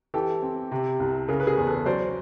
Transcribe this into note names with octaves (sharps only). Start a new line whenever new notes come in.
E3 G4 A4
C4
C3
C2
C#3 G#4 A#4
B4
G#4 A#4
E2
A4 B4
F#3 C5 D5